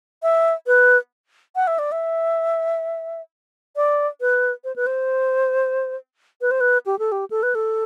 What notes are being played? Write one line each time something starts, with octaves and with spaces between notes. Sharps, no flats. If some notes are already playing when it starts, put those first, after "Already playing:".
E5
B4
F#5
E5
D5
E5
D5
B4
C5
B4
C5
B4
C5
B4
G4
A4
G4
A4
B4
A4